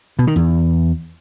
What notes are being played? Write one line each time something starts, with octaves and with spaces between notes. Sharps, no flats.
B2
D#3
E2